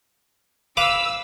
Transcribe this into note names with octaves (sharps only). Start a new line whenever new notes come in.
B4 F5 D6 E6